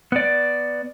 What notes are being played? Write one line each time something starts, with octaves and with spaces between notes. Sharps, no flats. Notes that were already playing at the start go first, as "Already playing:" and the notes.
B3 D5